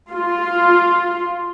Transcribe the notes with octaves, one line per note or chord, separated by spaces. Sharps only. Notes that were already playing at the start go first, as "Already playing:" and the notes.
F4